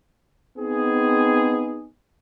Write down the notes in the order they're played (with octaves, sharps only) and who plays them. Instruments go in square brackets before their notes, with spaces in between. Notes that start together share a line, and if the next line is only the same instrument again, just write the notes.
[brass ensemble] B3 C4 D#4 G#4